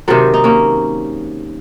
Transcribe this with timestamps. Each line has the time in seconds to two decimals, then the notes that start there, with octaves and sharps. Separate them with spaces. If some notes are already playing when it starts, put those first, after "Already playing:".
0.08 C3 D#3 F#3 A4 C5
0.34 D#4
0.44 A#3 C#4